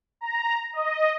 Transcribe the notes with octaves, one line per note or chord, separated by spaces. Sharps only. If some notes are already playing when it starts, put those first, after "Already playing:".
A#5
D#5